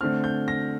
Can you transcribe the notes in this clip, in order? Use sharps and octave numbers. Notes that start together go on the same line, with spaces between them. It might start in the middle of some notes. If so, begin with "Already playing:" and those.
D3 A3 C4 F6
G6
A#6